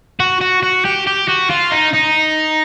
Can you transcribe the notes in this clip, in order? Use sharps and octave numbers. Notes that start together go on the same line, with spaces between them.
F#4
F#4
F#4
G4
G4
F#4
F4
D#4
D#4